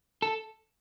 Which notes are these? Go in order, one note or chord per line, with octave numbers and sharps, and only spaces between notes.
A4